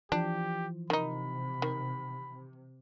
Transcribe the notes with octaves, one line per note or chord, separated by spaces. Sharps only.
E3 F3 D4 G4
C3 D#3 D#4 B5
D#3